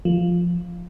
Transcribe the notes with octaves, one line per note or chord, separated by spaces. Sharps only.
F3